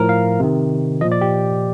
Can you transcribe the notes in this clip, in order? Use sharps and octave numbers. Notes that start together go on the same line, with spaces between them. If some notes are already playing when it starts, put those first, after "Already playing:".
Already playing: A2 F3 A#4
F5
C3 D#3
A#2 F3 D#5
D5
G4